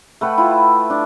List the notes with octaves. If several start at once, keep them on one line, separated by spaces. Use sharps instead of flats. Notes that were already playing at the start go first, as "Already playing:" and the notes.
A3 B4 F#5 G5
E4 F4
D4